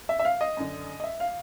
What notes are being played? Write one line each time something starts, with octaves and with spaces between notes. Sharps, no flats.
E5
E5
F5
D#5
F#2 D3
D#5
E5
F5